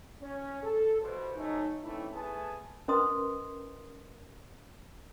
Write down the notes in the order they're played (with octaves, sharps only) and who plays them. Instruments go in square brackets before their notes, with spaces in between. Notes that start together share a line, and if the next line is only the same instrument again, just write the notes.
[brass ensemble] C#4
A4
C2 B2 B4 C5
F#3 A3 C#4 D#4
E3 A3 C4 C#4 D#4 E4
A3 B3 G#4 G#5 A5
[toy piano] C#4 A#4 B4 D#5 C6 D#6